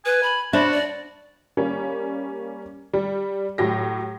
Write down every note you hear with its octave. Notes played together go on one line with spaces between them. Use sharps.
B4 G#5
B5
D4 F#4 C5 E5 B5
D5
G3 A#3 C#4
G3
A2 F#3 G4 A#6